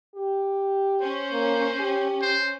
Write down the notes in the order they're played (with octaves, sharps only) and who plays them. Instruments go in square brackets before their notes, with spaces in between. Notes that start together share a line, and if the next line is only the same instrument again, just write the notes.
[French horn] G4
[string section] C#4 [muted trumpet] C5
[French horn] A#3
G4
[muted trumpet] C5